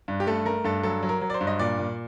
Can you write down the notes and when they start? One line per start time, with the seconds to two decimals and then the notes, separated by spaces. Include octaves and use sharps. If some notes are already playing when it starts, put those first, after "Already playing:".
0.08 G2
0.20 G4
0.27 A3 A4
0.45 A3 A#4
0.64 G2 A4
0.83 F#3 A4
1.03 F#3
1.09 A#4
1.21 F#3
1.30 D5
1.34 C5
1.41 G2
1.47 D#5
1.59 A#2 D5
1.79 A#2